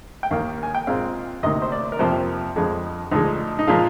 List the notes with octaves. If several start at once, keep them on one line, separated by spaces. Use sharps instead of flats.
G5
D#2 D#3 A#3 F5
G#5
G5
A#2 G#3 C4 F5
D2 C3 D#3 A#3 D#5
C5
D5
A#4
F2 C3 F3 A#3 C5
F2 D3 F3 G#3
D2 D3 F3 G#3 D#4
D#4
A#2 F3 G#3 F4